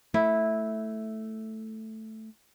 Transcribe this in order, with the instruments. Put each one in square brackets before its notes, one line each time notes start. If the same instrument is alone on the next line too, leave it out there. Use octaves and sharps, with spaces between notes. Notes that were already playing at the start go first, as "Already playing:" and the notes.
[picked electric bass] A3 [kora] E4